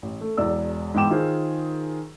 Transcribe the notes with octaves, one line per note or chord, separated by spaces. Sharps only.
A1
A3
E1 E2 D5 E6
G#2 E3 B3 G5 D6 E7
D#3 F4 G#4 C5